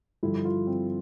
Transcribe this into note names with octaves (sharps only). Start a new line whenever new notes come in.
G2 D3 F3 E4
F4
C4